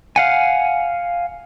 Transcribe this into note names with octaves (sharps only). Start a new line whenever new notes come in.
F5 F#5 G#5